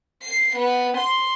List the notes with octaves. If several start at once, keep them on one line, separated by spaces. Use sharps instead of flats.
C7
B3
C6